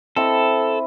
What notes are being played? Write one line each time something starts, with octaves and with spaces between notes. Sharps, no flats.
C4 E4 A4 D#5